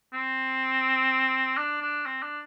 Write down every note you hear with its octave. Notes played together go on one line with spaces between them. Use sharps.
C4
D4
D4
C4
D4